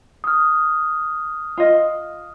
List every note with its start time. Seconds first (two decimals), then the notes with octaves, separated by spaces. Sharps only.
0.24 D#6 F6
1.57 F4 D#5